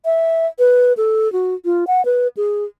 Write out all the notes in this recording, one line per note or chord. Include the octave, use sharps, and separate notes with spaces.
E5
B4
A4
F#4
F4
F#5
B4
G#4